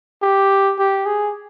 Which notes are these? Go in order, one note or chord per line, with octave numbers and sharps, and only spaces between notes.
G4
G4
G#4